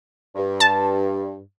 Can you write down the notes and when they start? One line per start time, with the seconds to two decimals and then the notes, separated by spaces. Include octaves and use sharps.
0.36 G2
0.60 A5